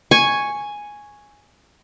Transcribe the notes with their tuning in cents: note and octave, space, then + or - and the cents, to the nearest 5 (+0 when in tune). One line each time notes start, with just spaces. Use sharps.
G#5 +0 C#6 +0